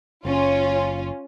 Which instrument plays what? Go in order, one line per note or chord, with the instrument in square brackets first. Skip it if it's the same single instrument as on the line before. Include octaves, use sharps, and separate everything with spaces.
[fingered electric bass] F#1 [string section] C#4 F4